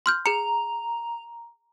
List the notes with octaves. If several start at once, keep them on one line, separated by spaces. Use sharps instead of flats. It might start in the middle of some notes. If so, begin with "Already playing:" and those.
C6 F6 G6
G#4 A#5 C#7